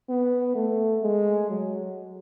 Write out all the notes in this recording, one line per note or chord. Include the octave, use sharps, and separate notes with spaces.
B3
A3
G#3
F#3